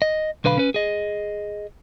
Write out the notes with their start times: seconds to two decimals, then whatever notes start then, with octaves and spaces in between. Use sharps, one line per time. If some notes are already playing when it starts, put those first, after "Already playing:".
0.02 D#5
0.44 B1 D3 B4 F5 B5
0.58 C#4 B4
0.74 G#4 D#5